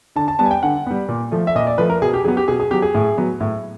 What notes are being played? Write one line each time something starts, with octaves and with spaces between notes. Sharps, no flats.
D3 A5
A5
G3 B3 A5
G#5
G5
D3 F#5
G3 B3
A#2
F3 A3
E5
A#2 D#5
D5
F3 A3 B4
A#4
B2 G#4
G4
F#3 B3 G#4
G4
B2 G#4
G#4
F#3 B3 G4
G#4
A2
F#3 B3
A2